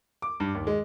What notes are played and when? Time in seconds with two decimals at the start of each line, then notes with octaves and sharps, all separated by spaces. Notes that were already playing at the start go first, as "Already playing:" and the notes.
0.22 D6
0.40 G2
0.55 D#2
0.67 G#3